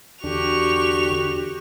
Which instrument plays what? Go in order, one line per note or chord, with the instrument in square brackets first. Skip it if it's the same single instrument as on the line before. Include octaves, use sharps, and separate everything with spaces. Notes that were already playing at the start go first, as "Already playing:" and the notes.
[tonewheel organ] E2 D3 D4 [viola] F#4 G4 [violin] C#6 F7